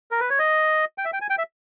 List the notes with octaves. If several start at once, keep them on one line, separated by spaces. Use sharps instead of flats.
A#4
B4
C#5
D#5
G5
E5
G5
G#5
G5
E5